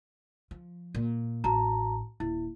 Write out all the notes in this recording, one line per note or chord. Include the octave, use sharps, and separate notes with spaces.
F3
A#2
A1 F#4 A5 A#5
D#1 E4